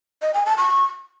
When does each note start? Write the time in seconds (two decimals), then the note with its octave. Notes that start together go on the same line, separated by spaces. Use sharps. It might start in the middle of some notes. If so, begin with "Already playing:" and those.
0.22 D#5
0.34 G#5
0.46 A5
0.58 C#6